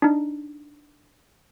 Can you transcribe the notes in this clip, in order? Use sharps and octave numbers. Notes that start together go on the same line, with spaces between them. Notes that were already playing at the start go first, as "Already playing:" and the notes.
D4 D#4